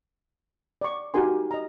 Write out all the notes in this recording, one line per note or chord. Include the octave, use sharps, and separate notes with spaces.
D5 C#6
D#4 F#4 G4 A#4 G#5 C6
D#5 A#5